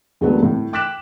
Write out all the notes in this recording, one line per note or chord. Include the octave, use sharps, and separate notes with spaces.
D#2 D3 F#3 G#3 A3 B3
A2
G5 D6 F#6 B6 E7